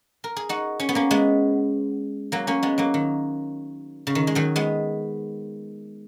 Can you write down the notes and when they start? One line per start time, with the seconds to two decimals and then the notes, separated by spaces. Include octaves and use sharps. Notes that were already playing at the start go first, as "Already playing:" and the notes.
0.24 A#4
0.36 G#4
0.49 D#4 F#4
0.80 C#4
0.89 B3
0.95 A#3 C#4
1.11 G#3 B3
2.32 F#3 A#3
2.47 A#3 C#4
2.63 G#3 B3
2.78 F#3 A#3
2.94 D#3
4.07 C#3
4.15 D#3
4.27 G#3
4.35 D#3 F#3
4.56 G#3 B3